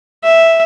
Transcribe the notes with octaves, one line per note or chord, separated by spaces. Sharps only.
E5